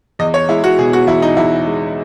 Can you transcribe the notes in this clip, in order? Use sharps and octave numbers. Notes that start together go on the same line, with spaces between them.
E2 D#5
C#5
G#3 E4
F#4
B2 G#4
F#4
E2 E4
D#4
E2 E4
G#3